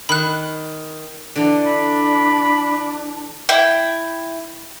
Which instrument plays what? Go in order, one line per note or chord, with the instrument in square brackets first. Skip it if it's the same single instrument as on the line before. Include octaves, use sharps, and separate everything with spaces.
[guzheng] D#3 [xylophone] B5 F#6
[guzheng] D3 E3 [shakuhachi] D4
[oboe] B5
[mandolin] E4 G5